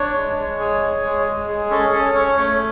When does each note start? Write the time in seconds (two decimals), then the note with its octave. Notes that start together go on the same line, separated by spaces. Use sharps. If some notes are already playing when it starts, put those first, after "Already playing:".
Already playing: D4 C#5
0.15 G#3
0.38 G#3
0.60 G#4
0.82 G#4
1.04 G#3
1.26 G#3
1.48 G#4
1.70 C#4 A4
1.93 C#4 A4
2.15 C#4 C#5
2.37 A3 C#5